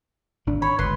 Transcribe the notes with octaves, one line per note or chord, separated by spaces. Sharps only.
G#1 D3 D4
C#5 B5
G1 C#2 B4 C6